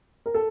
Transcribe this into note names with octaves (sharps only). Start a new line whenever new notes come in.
A#4
A4